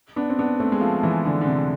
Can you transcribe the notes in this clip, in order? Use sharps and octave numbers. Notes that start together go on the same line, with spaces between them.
B3 D4
C4
B3 D4
A3 C4
G#3
F3 A3
E3 G#3
D3
D3
C3